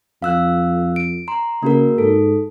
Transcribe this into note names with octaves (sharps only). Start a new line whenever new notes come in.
F2 F5 E6 F#6
D7
A#5 C6
C#3 A#3 F#4 A#4
G#2 A4